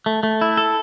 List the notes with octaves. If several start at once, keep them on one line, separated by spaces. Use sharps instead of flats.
A3
A3
E4
A4